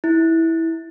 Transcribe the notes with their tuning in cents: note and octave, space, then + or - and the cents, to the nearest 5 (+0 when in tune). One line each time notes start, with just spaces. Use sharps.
E4 -15